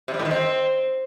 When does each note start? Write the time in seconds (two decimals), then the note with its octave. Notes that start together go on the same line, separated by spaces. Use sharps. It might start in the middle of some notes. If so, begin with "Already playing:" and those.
0.08 C3
0.14 G3
0.19 A2
0.25 D#3
0.31 C4